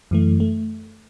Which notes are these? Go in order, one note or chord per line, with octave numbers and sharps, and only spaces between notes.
F#2 E3 A3
A3